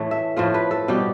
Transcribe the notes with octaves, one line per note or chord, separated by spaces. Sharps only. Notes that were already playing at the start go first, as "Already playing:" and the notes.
Already playing: A2 E3 A3
E5
A2 F3 A3 C5
B4
A4
B2 G3 G4